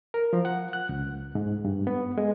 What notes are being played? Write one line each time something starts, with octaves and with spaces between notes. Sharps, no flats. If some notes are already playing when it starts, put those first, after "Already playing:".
A#4
F3
F#5
F#6
C#2
G#2
G2
B3
G#3